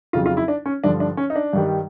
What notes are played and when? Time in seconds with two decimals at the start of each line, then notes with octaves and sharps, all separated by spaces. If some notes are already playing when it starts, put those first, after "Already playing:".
0.13 F2 C#3 F#3 F4
0.26 F4
0.37 E4
0.48 D4
0.66 C#4
0.84 G2 D3 F3 D4
1.00 D4
1.17 C#4
1.30 D#4
1.36 D4
1.53 G2 D#3 G3